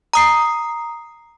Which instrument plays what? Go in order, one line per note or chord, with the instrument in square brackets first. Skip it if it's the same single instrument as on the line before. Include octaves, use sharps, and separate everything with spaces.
[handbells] A#5 D#6 C7